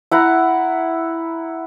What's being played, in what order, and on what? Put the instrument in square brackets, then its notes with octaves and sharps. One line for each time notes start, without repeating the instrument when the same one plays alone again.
[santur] E4 F#5 A#5